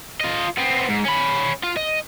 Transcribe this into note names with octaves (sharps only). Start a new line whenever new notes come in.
F4 D#5
B3 C4
G#2
C#4 B5
F4
D#5